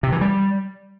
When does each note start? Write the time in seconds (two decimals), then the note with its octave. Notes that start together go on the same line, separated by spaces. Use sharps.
0.03 C3
0.12 E3
0.21 G3